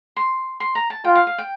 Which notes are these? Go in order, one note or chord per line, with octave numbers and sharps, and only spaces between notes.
C6
C6
A#5
A5
F4 G5
F5
F5
G5